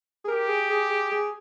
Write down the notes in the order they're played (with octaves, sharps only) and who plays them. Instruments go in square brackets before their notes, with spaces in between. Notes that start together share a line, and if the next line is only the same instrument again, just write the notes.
[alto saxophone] G#4
[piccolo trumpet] G4 [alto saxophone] A#4
[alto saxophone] G#4
G#4
G#4
G#4